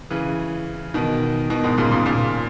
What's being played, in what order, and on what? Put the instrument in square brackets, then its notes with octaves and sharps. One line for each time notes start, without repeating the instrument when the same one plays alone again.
[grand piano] C#3 E3
B2 D#3
B2 D#3
G#2 B2
A#2 C#3
A#2 C#3
A#2 C#3